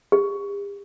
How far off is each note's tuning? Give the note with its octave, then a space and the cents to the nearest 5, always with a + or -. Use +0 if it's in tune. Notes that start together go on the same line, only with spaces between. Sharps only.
G4 +45